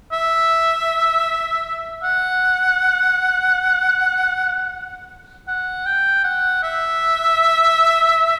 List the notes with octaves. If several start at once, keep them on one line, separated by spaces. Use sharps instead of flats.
E5
F#5
F#5
G5
F#5
E5